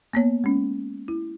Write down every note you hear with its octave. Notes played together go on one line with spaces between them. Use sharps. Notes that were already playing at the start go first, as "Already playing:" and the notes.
A#3 B3 C#5
G#3 C#4
E4